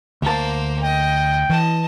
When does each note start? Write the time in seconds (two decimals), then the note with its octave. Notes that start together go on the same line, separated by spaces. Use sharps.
0.22 D2 A#3 C5 A5
0.83 D#5 G5
1.50 E3 D#5 A5